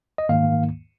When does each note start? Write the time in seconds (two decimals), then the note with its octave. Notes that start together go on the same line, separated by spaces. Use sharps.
0.18 D#5
0.29 G#2 D#3 A#3 F5